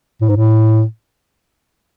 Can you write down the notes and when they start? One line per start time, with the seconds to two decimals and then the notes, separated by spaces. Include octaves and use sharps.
0.21 A2
0.29 G#2
0.36 A2